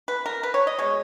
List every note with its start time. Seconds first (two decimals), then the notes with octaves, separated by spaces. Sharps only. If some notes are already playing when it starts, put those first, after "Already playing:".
0.08 B4
0.26 A#4
0.43 B4
0.54 C#5
0.67 D#5
0.79 B2 G#3 C#5